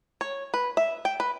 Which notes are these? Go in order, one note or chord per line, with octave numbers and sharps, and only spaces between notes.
C#5
B4
E5
G5
B4